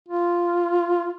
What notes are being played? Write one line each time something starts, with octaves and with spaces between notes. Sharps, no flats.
F4